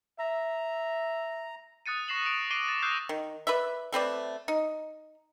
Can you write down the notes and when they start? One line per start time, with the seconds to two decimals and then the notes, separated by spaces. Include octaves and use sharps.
0.19 E5 A#5
1.86 D#6 F#6 A6 C#7 D#7
2.08 C#6 A#6 C7 E7 F#7
2.25 D7 F7
2.51 D6 C7 D7 D#7 G7
2.68 A6
2.82 D#6 E6 F#6 G6 A#6 C7
3.09 D#3
3.47 B4 D5 E5
3.92 A3 C4 B4 D5
4.48 D#4